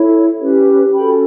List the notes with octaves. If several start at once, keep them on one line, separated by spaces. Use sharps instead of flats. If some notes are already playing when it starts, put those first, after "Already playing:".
Already playing: E4 A4 C#5
C#4 G4 B4
C#4 F#4 A4 G5 B5